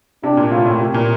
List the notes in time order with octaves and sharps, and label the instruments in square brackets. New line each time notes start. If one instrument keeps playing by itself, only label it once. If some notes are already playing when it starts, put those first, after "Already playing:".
[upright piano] C3 [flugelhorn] D4
[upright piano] A#2
[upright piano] A2 [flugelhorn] F4
[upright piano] A2
C3
A#2